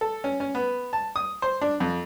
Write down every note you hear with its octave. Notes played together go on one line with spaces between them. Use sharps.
A4
C#4
C#4
B3
A5
D#6
C5
D4
F2